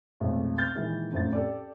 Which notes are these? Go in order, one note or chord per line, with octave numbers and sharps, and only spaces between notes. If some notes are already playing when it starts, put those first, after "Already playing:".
B1 F2 G#3 A3
F6 G6 A6
A#2 D#3 E3 G#3
F#1 F2 A2 A6
G4 A4 D5